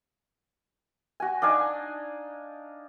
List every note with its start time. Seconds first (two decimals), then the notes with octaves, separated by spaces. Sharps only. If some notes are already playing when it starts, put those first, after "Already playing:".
1.20 F#4 G#5
1.42 D4 D#4 F5 G#5